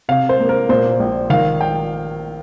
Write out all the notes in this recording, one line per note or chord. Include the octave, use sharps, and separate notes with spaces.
C3 F5
C5
A#3
A#4
A#2 C5
A#1
D#3 F5
G5